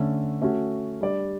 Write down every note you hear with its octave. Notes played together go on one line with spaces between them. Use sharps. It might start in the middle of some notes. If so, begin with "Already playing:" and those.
Already playing: D3 A3 C#4
A3 C#4 F#4
G3 D4 G4 D5